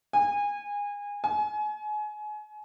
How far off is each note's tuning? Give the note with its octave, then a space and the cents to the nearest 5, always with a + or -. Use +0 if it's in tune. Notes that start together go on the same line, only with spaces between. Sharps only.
G#5 -25
G#5 +30